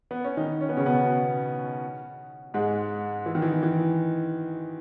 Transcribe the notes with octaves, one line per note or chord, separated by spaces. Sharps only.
B3
C#4
D#3 D#4
C#4
B3
C#3 C#4
B2 B3
G#2 G#3
E3
D#3
E3
E3